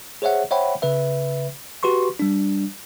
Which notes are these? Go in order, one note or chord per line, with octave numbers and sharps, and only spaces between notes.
G#4 C5 C#5 E5 F#5
C5 C#5 E5 F#5 G5 B5
C#3 B4 E5
F#4 G4 B4 C6 C#6
G3 D4